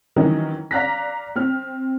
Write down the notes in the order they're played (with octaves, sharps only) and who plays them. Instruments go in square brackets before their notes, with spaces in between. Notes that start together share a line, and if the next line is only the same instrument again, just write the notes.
[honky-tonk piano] D#3 E3 F#3 C#4 D#5
D5 F5 A#5 F#6 A#6 B6
C4 F6